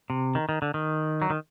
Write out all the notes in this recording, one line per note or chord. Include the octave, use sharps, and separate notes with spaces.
C3
D#3
D#3
D3
D#3
F#3
D#3